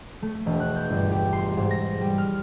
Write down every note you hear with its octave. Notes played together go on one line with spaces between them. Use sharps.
A3
E1
F#6
G6
G1
G4
C6
G#2
A#6
G3
F6